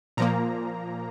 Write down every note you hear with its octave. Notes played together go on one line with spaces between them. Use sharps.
A#2 F3 A#3 A#5